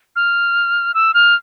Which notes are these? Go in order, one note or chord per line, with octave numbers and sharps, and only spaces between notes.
F6
E6
F6